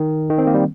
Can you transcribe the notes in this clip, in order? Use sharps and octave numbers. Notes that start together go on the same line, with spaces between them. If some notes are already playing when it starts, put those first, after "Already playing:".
Already playing: D#3
D#3
C4
A#3
G3